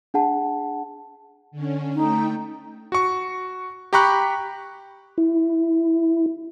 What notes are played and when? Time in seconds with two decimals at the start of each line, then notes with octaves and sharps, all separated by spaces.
0.14 D4 G#4 F#5 A5
1.51 D3 C#4
1.95 A3 D#4 G5
2.92 F#4 C#6
3.93 G4 G5 A#5 B5 C#6 F#6
5.18 E4